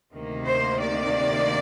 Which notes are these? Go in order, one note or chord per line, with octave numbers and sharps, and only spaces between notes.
D2 C3 D#3 A#3
C5
D5